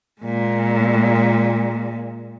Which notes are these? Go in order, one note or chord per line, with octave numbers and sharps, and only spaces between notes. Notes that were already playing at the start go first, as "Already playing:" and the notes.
A#2 G#3